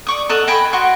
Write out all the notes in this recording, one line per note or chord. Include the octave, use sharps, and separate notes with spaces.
D5 C#6 D#6
A4 D#5 F#5
D#5 G5 G#5 B5
F#4 D#5 C6 C#6